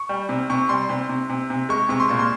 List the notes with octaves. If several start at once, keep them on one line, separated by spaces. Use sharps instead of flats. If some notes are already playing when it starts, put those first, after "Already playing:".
Already playing: C#6
G3
C3
C3 C#6
G3 C6
C3
C3
C3
C3
G#3 C#6
C3 C#6
C6
A#2 C#6
C6